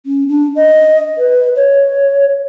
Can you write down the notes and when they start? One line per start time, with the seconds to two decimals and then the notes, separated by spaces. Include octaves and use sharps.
0.06 C#4
0.28 D4
0.56 D#5
1.18 B4
1.56 C#5